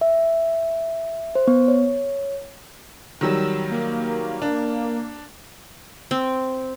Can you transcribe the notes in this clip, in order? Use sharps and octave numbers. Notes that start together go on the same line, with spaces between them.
E5
C5
B3
C#5
D#3 F#3 G3 E6
A#3
D4
C4